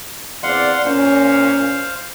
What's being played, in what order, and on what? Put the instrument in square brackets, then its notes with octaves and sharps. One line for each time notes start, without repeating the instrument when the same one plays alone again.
[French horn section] E2 C4 D5 [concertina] F5 F#5 C6
[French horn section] A#2 C#4 [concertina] C5 F5